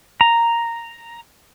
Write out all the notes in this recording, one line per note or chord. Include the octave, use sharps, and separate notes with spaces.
A#5